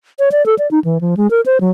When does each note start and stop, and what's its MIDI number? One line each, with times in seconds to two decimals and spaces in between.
0.19 0.29 73
0.32 0.45 74
0.46 0.55 69
0.59 0.69 74
0.71 0.79 63
0.84 1.01 52
1.01 1.15 53
1.17 1.30 56
1.30 1.41 70
1.46 1.58 72
1.61 1.71 54